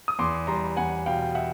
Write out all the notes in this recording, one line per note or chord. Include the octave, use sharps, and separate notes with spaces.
D#6
E2 C6 D6
G3 A#5 C6
E2 F#5 G#5
B2 F5 G5
E5 F#5